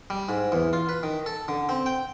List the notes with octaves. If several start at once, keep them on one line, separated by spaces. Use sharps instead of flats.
G3
G#2
E2
F4
B4
D#3
A4
D3
C4
G5